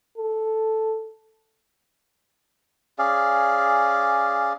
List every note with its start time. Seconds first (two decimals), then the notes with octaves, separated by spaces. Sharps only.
0.18 A4
2.98 C#4 G#4 D5 F5